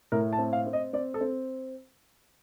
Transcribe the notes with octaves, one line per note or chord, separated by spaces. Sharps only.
A2 A#4
A5
C4
F5
C4
D#5
C4 D5
A4
C4